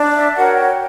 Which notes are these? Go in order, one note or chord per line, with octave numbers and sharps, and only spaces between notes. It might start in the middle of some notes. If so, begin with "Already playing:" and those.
Already playing: D4
E5
F#4 A#4 C#5 F#5
G5